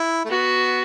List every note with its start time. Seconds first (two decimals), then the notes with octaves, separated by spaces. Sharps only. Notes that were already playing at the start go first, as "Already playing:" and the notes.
Already playing: E4
0.25 A3
0.29 B3 F#4